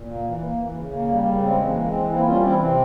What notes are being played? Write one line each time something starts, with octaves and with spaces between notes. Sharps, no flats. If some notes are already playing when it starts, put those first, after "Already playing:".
Already playing: A#2
A#3
E3
A#3
E3
C#3
A#3
G3
C#3
G#3 C4
E3
A#3
G#3
C4
E3
A#3 C4 E4
G3 C#4 F4
E3 C4 E4
C3 C4